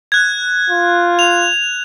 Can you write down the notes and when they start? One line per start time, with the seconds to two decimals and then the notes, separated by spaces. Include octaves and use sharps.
0.12 F#6 G#6
0.70 F4
1.19 F7